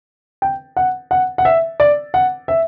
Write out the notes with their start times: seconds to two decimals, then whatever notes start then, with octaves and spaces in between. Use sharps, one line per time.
0.42 G5
0.77 F#5
1.11 F#5
1.38 F#5
1.45 E5
1.80 D5
2.14 F#5
2.48 E5